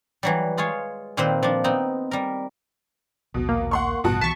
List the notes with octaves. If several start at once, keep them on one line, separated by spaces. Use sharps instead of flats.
E3 F#3 G3
G#3 F4 G#4 C#5
A#2 D#3 A#3 C4 B4 C5
F3 D4
B3 C4 D#4
G3 A#4
A#1 D#2 B2
A#3
F#5 C6 C#6
A1 G2 B2 F#4 A5
C2 E3 A5 C#6 B6